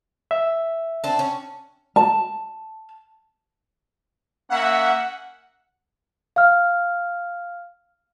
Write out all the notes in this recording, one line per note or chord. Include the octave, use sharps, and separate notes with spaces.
E5
C4 D4
C#4
A5
A#3 C#4 E5 F#5
F5 F6